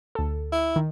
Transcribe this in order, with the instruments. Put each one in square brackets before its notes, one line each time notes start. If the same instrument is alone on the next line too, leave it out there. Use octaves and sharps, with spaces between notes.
[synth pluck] D2 A4
[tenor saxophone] E4
[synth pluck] D#3